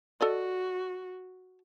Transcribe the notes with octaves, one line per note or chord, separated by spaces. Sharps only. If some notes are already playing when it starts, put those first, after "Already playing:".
F#4 A4 D5 D#5